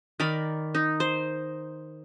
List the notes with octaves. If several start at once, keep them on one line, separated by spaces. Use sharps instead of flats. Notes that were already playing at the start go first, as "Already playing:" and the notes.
D#3 A#4 D5 B5
D#4
C5